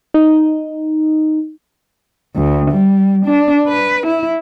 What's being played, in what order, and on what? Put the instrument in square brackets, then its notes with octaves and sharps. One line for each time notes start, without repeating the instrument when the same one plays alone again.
[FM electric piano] D#4
[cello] D2
G3
D4
B4
E4